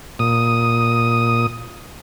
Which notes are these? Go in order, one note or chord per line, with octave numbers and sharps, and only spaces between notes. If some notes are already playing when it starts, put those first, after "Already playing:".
A#2 D#6